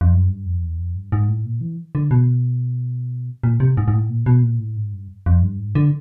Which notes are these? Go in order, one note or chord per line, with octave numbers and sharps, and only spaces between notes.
F2
F#2
G2
F2
E2
F2
G2
G#2
A2
A#2
E3
D3
B2
A#2
C3
G#2
G#2
A2
A#2
B2
A#2
A2
G#2
G2
F2
G2
G#2
D3